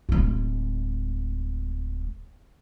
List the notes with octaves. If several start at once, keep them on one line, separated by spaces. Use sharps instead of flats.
D1 G#3